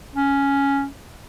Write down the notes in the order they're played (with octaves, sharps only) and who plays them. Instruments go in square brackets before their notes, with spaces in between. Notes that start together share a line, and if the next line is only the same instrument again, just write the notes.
[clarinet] C#4